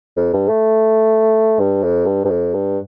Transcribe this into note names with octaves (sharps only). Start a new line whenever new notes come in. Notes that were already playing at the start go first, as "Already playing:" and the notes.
F2
G2
A3
G2
F2
G2
G2
F2
G2